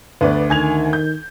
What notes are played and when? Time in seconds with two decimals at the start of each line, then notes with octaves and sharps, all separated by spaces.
0.21 D2 B3 B4 D5
0.50 D#3 G#5 G#6 F7
0.93 G6